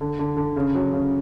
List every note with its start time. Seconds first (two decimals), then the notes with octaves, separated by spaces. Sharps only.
0.01 D3
0.19 D3
0.37 D3
0.56 C#3
0.75 F#3
0.93 C#3